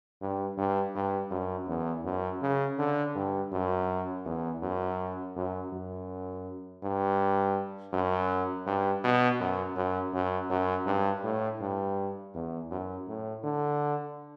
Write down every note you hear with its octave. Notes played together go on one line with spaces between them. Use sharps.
G2
G2
G2
F#2
E2
F#2
C#3
D3
G2
F#2
E2
F#2
F#2
F#2
G2
F#2
G2
B2
F#2
F#2
F#2
F#2
G2
A2
G2
E2
F#2
A2
D3